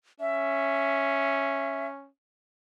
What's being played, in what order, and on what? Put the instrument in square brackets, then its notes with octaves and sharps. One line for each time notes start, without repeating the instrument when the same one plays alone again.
[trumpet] C#4 [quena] E5